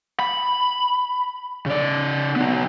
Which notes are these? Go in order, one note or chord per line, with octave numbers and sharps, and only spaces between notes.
B5
C#3 D5
B3 D#4